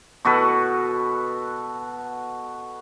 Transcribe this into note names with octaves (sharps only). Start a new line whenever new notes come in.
B2 F#4 A4 B4